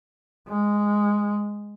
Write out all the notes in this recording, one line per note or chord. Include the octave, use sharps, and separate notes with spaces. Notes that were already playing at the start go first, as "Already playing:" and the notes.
G#3